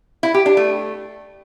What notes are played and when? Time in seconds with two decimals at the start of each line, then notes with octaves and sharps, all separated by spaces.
0.23 E4
0.34 G4
0.46 D4
0.57 A3